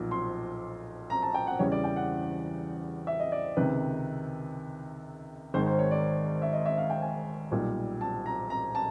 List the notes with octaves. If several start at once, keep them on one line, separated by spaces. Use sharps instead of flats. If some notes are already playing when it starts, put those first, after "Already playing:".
Already playing: B1 A#2 F3
C6
A#5
A5
G5
F#5
E2 C#3 E3 G3 C#5
D5
G5
F#5
E5
D#5
D5
C#2 C3 D#3 B4
G#1 G#2 D#3 C5
C5
C#5
D5
E5
D#5
E5
F5
G5
G#5
B1 A#2 G3
A5
A#5
A#5
A5